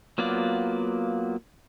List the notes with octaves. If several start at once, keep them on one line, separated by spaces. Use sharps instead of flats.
F#3 A#3 B3 F4 D5